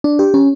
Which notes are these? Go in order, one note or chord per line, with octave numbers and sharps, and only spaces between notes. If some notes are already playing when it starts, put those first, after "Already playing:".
D4
G4
C#4